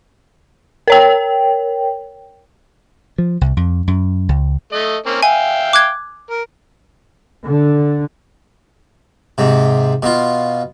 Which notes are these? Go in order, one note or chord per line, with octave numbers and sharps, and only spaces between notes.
A#4 C#5 G5
F3
C2
F2
F#2
C#2
A3 D#5
A#3 C4 C#4
E5 F5 G5 G#5
D6 F#6 G#6
A#4
D3
G#2 C3
B2 F4